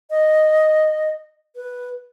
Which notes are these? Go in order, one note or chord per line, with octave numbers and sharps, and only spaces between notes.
D#5
B4